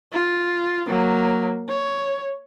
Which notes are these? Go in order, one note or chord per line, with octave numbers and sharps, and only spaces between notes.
F4
F#3 A#3
C#5